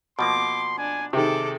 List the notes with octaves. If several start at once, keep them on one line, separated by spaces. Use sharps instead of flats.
B2 F3 A#3 C6 D6
D4 G#5
C3 D#3 G#4 A4 D6